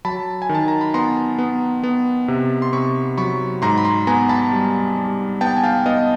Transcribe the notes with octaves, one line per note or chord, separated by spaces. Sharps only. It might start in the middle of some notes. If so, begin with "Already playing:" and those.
F#3 A5 B5
G#5
D#3
A5
A#5
B5
B3 A#5 C6
B3
B3
C3
C6
C3 B5 C#6
F#3 B5 C#6
G#2 A#5 C6
B5
A#5 C6
B3 G#5 A#5
A5 B5
G3
G3
B3 G5 A5
G#5
F5 G5
B3 D#5 F5